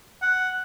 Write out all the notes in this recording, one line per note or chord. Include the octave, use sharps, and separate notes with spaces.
F#5